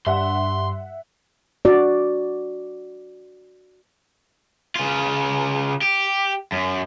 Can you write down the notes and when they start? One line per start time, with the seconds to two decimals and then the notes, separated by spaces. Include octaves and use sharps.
0.07 G2 E5 F#5 C6
1.65 F#4 D5
4.75 C#3 F4
5.81 G4
6.52 F#2